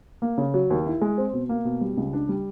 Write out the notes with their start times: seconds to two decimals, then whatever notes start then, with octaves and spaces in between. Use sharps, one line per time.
0.22 A#3
0.38 C#3
0.54 F#3
0.70 D#2
0.86 E4
1.01 G#3
1.18 C4
1.33 B2
1.49 A#3
1.65 B2
1.81 G3
1.97 C#2
2.13 D4
2.29 G3